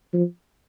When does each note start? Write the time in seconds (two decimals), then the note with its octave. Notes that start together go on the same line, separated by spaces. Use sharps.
0.13 F3